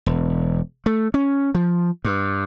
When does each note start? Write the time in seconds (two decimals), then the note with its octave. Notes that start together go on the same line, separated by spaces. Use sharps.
0.06 E1
0.86 A3
1.14 C#4
1.55 F3
2.05 G2